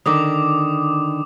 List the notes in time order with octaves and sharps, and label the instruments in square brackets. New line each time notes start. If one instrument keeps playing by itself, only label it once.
[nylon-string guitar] D3 D#3 [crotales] D6 D#6